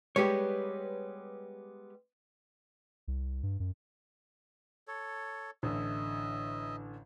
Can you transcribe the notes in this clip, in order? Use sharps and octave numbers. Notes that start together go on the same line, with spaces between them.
G3 G#3 B3 G4 B4 C#5
C2
G2
F#2
A4 C#5
A1 D3 D#5 E5